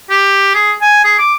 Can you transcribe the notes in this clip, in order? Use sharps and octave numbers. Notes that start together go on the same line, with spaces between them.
G4
G#4
G#5
G#4
D6